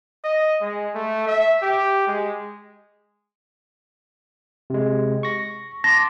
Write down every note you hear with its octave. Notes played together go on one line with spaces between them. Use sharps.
D#5
G#3
A3
E5
G4
G#3
C3 G#3
C#6 A#6
A5 C6 D6 A#6